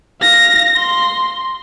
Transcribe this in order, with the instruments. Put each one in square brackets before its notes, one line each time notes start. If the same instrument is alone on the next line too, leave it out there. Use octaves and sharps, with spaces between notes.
[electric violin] F5 A#6
C6